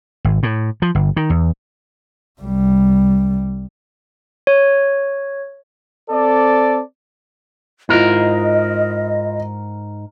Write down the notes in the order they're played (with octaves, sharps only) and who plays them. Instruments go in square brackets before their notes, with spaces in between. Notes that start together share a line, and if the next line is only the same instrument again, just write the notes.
[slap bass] G#1
A2
F3
G1
D#3
E2
[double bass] C2 G3
[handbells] C#5
[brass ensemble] C4 A4 D5
[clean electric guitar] G#2 A#4 [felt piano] E4 F4 [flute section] D#5